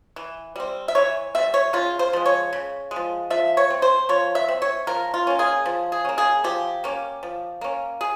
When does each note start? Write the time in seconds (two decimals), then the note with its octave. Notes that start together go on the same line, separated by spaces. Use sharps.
0.16 E3
0.56 G3 C4
0.88 E5
0.95 E3 C#5
1.35 C4 E5
1.39 G3
1.54 C#5
1.73 C#3 F4
1.99 C5
2.13 F3 G#3
2.26 C#5
2.53 C#3
2.91 G#3
2.96 F3
3.30 F3 E5
3.57 C#5
3.70 C4
3.82 C5
4.09 F3 C#5
4.35 E5
4.48 C4
4.62 C#5
4.87 F3 A#4
5.14 F4
5.27 A#3 C#4
5.39 G#4
5.66 F3
5.92 G#4
6.05 A#3 C#4
6.18 G#4
6.44 F3 G4
6.84 A#3 C#4
7.23 F3
7.61 A#3 C#4
8.01 G#4